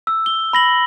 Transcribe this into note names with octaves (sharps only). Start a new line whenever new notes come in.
E6
G7
B5 A#6 F#7